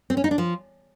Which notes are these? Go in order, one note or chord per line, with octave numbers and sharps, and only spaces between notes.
C4
C#4
D#4
D4
F3